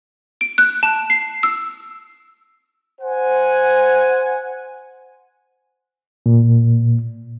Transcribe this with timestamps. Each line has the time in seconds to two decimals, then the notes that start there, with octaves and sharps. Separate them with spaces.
0.41 D7
0.58 F#6
0.83 A5
1.10 C7
1.43 E6
3.01 C5 F#5 G#5
6.26 A#2